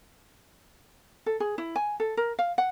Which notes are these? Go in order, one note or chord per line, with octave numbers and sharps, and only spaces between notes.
A4
G#4
E4
G#5
A4
A#4
F5
F#5